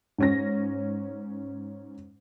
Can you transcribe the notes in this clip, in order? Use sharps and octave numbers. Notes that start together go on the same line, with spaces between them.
G#2 C#4 A#6